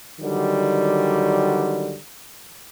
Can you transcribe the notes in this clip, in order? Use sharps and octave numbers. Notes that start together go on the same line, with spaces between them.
D3 D#3 F#3 G3